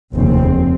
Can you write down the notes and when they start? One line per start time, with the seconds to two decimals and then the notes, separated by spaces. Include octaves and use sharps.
0.16 F1 D#2 C#3 C4